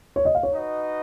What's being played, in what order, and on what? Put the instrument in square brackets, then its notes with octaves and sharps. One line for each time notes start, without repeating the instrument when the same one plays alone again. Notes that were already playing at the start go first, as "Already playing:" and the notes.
[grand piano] C#5
D#5
F5
C#5
[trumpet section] D#4 F#4 B4 D#5